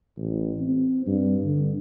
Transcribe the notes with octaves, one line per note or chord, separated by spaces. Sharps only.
A1
C4
G2
D3